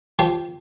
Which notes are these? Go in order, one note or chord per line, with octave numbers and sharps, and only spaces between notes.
F3 G4